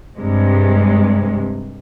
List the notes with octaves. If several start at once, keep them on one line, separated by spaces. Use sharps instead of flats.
G2 C3 G#3